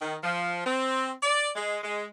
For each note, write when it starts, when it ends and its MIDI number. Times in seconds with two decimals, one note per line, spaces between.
0.01 0.16 51
0.23 0.65 53
0.65 1.10 60
1.23 1.49 74
1.55 1.78 56
1.82 2.05 56